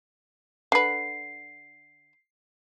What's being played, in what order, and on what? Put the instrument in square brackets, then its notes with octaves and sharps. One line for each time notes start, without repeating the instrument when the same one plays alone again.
[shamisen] D3 B4 [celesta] C7